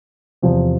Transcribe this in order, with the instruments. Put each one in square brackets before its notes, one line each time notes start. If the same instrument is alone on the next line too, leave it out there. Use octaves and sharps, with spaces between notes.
[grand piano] E2 C3 F3 C4